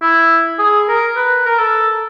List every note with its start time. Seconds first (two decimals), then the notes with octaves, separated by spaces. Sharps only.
0.02 E4
0.59 G#4
0.88 A#4
1.16 B4
1.46 A#4
1.59 A4